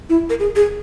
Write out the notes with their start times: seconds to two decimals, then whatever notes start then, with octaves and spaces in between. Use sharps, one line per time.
0.09 E4
0.30 A#4
0.40 G#4
0.56 G#4